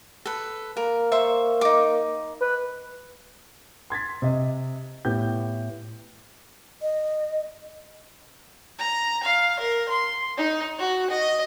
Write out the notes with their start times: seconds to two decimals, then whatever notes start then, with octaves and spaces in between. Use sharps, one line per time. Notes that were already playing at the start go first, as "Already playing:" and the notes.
0.26 A4 B4
0.77 A#3 A#4
1.12 C5 E5 C#6
1.61 D#4 D6
2.41 B4
3.90 C6 G#6 A6 B6
4.22 C3 D#5
5.05 A2 B3 G4 G6
6.82 D#5
8.79 A#5
9.23 F5
9.59 A#4
9.89 C6
10.37 D#4
10.78 F#4
11.10 D#5